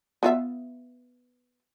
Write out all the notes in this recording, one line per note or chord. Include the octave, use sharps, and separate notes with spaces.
B3 F4 E5